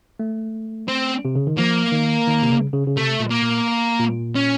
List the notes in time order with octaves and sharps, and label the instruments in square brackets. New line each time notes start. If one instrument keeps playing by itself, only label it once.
[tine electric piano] A3
[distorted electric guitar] C4
[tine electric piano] C3
C#3
D#3
[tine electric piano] F3 [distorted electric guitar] A#3
[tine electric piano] D#3
D#3
C3
C#3
C#3
C#3
[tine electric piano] C3 [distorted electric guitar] A3
[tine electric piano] A#2
[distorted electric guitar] A#3
[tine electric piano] A#2
A#2
[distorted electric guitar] C#4